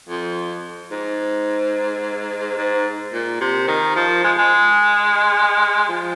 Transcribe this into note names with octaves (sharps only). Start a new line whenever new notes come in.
F2
G#2
G#2
A#2
C3
D#3
F3
G#3
G#3
F3